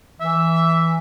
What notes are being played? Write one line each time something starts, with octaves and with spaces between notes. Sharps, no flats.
E3 E5